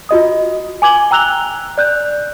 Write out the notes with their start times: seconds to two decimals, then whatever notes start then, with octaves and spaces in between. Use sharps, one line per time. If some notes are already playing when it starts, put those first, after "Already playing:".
0.09 F4 F#4 D#5 D#6
0.82 G#5 D6 G#6 F#7 G7
1.11 G5 A#5 E6 F#6 F7 G7
1.78 D5 F#6 G6